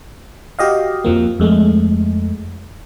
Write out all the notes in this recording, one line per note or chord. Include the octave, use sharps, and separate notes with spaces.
F#4 G4 D#5 F5
F2 F3 A#3
F2 G#3 A3